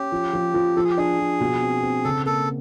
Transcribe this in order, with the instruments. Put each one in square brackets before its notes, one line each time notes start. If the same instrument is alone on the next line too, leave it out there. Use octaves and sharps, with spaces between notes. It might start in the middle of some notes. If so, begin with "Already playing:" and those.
Already playing: [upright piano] C#4 [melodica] G4
[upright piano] F3
F3
F3
[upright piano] F3 [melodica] A4
[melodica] G#4
G4
[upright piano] D4 [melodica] G#4
[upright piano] F3
B2
C4
C4
[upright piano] C#3 [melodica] A4
[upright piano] A#3 [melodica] A4